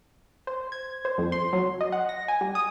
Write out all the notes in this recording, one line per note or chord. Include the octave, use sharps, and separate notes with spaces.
C5
G#6
C5
F2
C6
F#3
D#5
F#5
A#6
G#5
G3
D#6